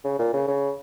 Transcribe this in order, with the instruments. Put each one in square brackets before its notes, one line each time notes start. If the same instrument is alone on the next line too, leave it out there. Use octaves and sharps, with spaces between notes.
[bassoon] C#3
A#2
C#3
C#3